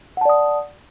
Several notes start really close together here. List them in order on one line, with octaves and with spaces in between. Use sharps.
F#5 A5 D5 D#6